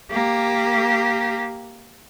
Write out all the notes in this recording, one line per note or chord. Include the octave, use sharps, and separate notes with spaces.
A#3 G4